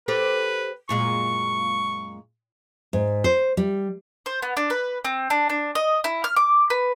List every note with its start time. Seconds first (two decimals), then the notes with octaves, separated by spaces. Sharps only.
0.08 G4 A4 B4 C5
0.89 F#2 A#2 G#3 C#6
2.93 G#2
3.24 C5
3.57 G3
4.26 C5
4.42 B3
4.57 D4
4.70 B4
5.05 C4
5.30 D4
5.49 D4
5.75 D#5
6.04 E4
6.24 F6
6.36 D6
6.70 B4